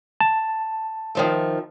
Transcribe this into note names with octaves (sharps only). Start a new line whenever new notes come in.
A5
D#3 F3 A3